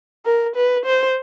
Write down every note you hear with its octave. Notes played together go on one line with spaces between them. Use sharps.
A#4
B4
C5